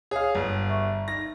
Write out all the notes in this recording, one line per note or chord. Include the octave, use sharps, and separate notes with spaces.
G#4 C#5 F5
G1
E5 C#6
D#4 A#6